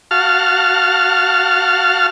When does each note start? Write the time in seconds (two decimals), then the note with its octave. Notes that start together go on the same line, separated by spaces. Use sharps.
0.11 F#4 F5 A5 F6